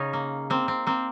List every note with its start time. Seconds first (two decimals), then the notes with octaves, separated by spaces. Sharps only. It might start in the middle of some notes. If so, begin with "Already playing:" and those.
Already playing: C#3 C#4 D#4
0.13 A#3
0.50 A#3 C4
0.68 C4
0.86 A#3 C4